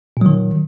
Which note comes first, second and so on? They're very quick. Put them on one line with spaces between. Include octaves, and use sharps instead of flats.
A#2 F#3 D#3